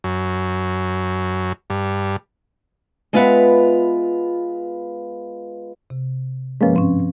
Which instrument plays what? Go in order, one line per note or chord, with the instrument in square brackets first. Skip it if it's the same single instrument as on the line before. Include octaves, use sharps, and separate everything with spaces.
[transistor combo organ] F#2
G2
[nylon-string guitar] G#3 B3 F4 B4 E5 F#5
[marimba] C3
[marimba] G2 F3 B4 [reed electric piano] G#3 A#3 C#4
[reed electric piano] G#2 [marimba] C4 C#4